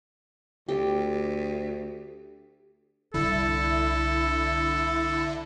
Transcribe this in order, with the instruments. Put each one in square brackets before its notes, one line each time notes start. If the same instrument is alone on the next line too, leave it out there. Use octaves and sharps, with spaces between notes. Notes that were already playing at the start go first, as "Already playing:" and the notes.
[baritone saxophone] D2 [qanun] G4
[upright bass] C2 G3 [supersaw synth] D3 E4 [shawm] A4